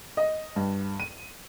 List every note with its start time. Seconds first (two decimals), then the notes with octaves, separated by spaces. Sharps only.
0.17 D#5
0.56 G2
1.00 D#7